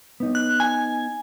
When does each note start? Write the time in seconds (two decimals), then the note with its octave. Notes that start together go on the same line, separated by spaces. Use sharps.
0.20 B3 D#4
0.35 F#6
0.60 G#5